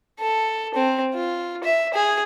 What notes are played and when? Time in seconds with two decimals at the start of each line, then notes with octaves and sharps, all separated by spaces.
0.19 A4
0.74 C4
1.14 F4
1.63 E5
1.94 G#4